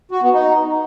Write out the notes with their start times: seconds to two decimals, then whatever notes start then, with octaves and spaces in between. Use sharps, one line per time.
0.11 F#4
0.22 B3
0.33 D#4